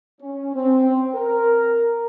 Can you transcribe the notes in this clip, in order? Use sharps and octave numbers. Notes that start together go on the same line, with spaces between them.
C#4
C4
A#4